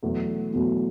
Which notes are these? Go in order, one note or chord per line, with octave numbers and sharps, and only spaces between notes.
E2 B2 F#3 A3
E2 B2 F#3 A3